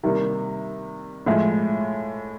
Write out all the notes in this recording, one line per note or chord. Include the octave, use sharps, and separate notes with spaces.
C3 D#3 G3 A#3
A2 F3 G#3